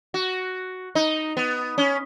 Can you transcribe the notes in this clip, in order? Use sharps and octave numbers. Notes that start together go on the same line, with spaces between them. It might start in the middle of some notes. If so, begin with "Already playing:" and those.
F#4
D#4
B3
C#4